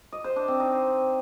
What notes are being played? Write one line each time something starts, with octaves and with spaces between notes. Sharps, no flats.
D#5
C5
D4
C4
D#4